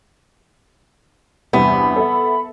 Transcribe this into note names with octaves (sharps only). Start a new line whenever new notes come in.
E2 G2 C3 B3 B5
A4 E5